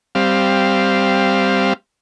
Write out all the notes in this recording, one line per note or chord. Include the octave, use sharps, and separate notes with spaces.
G3 C4 F5